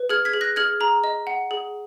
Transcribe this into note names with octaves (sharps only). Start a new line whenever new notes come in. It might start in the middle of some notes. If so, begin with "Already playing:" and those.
Already playing: B4
G#4 F6 G#6
G#6 B6
G#4
F#6 A#6
G#4 F6 G#6
G#4 A#5
D#5
F#5
G#4